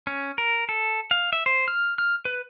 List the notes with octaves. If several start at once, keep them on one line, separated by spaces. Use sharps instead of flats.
C#4
A#4
A4
F5
E5
C5
F6
F6
B4